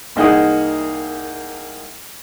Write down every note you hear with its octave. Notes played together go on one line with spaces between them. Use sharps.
C2 A#3 D#4 G#4 F#5 D#6